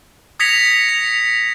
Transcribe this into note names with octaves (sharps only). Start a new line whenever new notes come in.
D#6 G#6 A#6 B6 C#7 F7
C#7